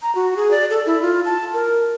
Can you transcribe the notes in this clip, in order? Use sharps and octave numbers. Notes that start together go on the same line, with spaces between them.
A#5
F#4
G#4
D5
A4
E4
F4
A5
A#4